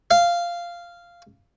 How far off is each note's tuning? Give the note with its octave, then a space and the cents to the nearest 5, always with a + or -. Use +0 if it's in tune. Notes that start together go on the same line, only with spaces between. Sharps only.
F5 -10